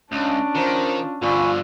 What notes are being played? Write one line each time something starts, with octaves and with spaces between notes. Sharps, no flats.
C#2 C#4 D4
D#3 F4 C5 A#5
G2 D3 F3 F4 G#5 B5 C#6